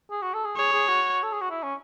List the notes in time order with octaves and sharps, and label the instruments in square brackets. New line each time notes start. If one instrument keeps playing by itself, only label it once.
[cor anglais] G#4
F#4
A4
G#4
[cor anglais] G#4 [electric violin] C#5
[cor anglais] G#4
F#4
A4
G#4
F#4
E4
C#4